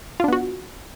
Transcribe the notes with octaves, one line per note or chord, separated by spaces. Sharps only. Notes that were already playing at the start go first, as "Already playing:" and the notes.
B3 D4 F4 F#4